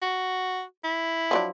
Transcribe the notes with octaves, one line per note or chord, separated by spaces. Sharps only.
F#4
E4
F3 F#3 D4